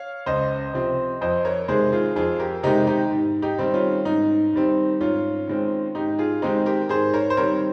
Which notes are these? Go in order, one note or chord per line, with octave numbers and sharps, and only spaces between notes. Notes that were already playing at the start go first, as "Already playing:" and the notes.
Already playing: C#5 F5
C#2 C5 D#5
C3 F3 C4
F2 C5 D#5
A#4 C#5
C3 D#3 G#3 G#4 C5
F4 G#4
F2 F4 G#4
G4 A#4
C3 D#3 G#3 D#4 G4
D#4 G4
G#2
D#4 G4
D#3 G3 C4
C#4 F4
G#2 D#4
D#3 G3 C4
G#2 C#4 F4
D#3 G#3 C4
G#2 D#4 G4
F4 G#4
D#3 G#3 C4 D#4 G4
G4 A#4
G#2 G#4 C5
A#4 C#5
C5
D#3 G3 C4 A#4 C#5